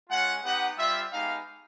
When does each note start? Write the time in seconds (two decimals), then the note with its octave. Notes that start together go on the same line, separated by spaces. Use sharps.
0.09 G#3 C#4 F4 F#5
0.43 B3 D#4 G4 F#5
0.77 G3 C4 F4 E5
1.11 G#3 B3 D#4 G4 F5